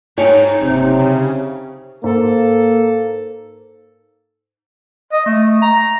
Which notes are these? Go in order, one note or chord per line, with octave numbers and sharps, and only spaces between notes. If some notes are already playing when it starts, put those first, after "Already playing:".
G#2 D#4 C#5 G5 G#5
F#1 C3
C#3
G#2 A#3 A4
D#5
A3
A#5